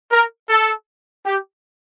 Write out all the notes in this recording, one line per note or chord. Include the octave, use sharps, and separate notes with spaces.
A#4
A4
G4